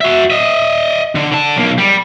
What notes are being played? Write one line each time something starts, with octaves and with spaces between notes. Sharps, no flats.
F#4 E5
D#5 E5
D3
D3 A5
B1 A#3
G3